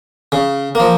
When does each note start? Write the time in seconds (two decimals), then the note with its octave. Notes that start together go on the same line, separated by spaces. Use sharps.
0.32 C#3
0.75 F3 A#3